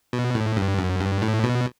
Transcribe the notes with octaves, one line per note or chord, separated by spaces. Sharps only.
B2
A2
G2
F#2
G2
A2
B2